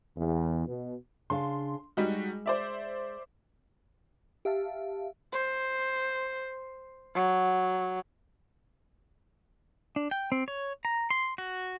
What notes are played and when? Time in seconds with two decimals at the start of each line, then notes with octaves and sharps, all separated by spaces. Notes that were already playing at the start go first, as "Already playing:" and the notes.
0.17 E2
0.66 B2
1.30 C#3 D4 F5 C6
1.97 G3 G#3 D#4 F#4
2.46 C5 D5 E5
4.45 G4 E5 F5 A5
5.33 C5
7.15 F#3
9.96 D4
10.11 G5
10.32 C4
10.48 C#5
10.85 A#5
11.10 C6
11.38 F#4